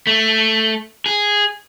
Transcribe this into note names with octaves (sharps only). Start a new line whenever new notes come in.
A3
G#4